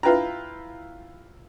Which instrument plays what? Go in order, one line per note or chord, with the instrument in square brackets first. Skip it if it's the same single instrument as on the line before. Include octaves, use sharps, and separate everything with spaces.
[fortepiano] E4 F4 B4 G5 A#5